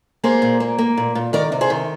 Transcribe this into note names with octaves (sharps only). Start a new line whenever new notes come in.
A#3 G#4 C5
A#2
A#3
A#3
A#2
A#2
D#3 A#4 D5
C3
G#4 C5
D#3